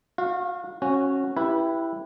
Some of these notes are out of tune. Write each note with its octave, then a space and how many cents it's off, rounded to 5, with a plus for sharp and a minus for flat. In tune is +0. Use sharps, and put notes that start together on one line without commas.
F#4 -35 F5 +0
C#4 -15 F#4 +0
E4 +5 G4 +0 B4 -15